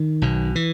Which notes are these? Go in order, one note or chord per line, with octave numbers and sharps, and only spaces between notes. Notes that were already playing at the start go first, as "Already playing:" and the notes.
Already playing: D#3
B1 B2
E3